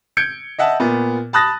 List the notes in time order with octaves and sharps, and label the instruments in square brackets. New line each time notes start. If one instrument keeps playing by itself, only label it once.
[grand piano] G6 G#6 C#7 D7
D#5 E5 F#5 A5
A#2 B3
A5 B5 D#6 F#6 A6 A#6